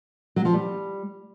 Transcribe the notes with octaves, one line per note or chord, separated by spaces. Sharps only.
F#3
F3
G3